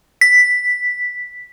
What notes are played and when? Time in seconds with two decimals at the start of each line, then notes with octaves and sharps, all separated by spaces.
0.21 B6